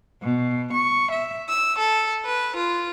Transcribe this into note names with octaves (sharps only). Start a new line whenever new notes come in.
B2
C#6
E5
E6
A4
B4
F4